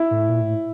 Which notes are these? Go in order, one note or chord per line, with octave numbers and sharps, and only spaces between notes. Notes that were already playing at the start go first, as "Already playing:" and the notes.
Already playing: E4
A2
A#2
A2